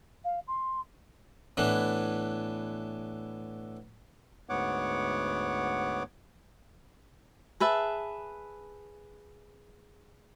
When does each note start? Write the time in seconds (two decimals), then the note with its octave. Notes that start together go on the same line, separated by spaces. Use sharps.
0.24 F5
0.47 C6
1.57 A2 E3 B3 D4
4.49 D2 G#2 B3 C#5 F#5 D6
7.60 G#4 B4 E5 A5